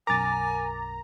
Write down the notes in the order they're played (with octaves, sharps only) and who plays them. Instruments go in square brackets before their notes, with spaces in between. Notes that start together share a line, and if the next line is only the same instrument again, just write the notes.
[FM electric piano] B1 F#2 A#4 [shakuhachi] G#5 [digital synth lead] A#5 [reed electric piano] D6 A6